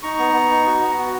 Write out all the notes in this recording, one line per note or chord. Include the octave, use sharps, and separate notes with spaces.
D#4 A#5 C#6
B3
B3
D#4
F#4
B3
F#4